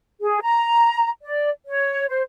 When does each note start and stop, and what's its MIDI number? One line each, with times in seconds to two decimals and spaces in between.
0.20 0.39 68
0.42 1.09 82
1.22 1.50 74
1.66 2.06 73
2.08 2.21 72